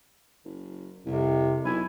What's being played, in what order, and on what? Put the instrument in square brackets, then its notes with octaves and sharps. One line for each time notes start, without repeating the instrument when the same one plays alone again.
[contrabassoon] F#1
[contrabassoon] C2 [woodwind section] F2 C3
[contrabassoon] B1 [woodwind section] E4 G#5